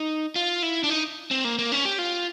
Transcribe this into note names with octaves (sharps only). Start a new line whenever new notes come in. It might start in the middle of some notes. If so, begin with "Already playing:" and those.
Already playing: D#4
F4
E4
D4
D#4
C4
A#3
A#3
C#4
G4
F4